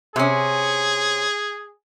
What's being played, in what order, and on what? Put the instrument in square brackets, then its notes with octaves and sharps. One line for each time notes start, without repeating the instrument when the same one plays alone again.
[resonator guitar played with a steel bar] C3 C#4 [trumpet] G#4